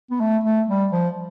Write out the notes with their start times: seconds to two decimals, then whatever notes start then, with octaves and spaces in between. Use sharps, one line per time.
0.11 B3
0.20 A3
0.44 A3
0.68 G3
0.92 F3